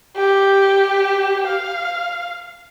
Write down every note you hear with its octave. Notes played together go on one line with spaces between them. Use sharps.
G4
F5